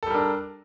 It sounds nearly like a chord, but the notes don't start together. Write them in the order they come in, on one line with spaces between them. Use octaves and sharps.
A4 G3 A#4 D4